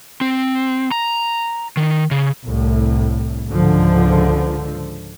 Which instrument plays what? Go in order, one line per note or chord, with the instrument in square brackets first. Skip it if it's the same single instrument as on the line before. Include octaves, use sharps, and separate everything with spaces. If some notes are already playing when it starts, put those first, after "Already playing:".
[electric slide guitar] C4
A#5
D#3
C#3
[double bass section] C2 A2
C#2 G#2 D3 F3